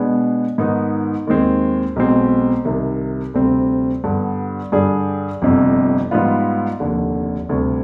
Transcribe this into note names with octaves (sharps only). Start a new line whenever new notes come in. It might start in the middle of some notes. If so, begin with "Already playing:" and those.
Already playing: B2 G#3 B3 D4
G#2 D#3 B3 D#4
D#2 D#3 G#3 C4
B1 B2 G#3 C4
C2 C3 D#3
D2 C3 G3 C4
G2 D3 G3 B3
G2 D3 G3 D4 G#4
G1 F2 C3
G#2 G3 B3 F4
F1 D#2 D3
D2 C3 G3